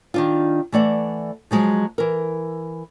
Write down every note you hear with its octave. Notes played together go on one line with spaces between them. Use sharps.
D#3 D4 F4
E3 A3 D5 F#5
F3 F#3 G#3
E3 A#4